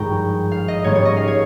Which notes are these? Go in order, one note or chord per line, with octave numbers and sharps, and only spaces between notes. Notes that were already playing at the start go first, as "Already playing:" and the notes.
Already playing: G#1 G2 F3 G#3 G5 A#5 C#6
F5
D#5
G#1 G#2 G3 A#3 C#4 C#5
C#5
D#5
F5
C#5